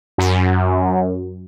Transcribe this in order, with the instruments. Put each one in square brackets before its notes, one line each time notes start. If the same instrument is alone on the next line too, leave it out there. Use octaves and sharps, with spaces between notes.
[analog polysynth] F#2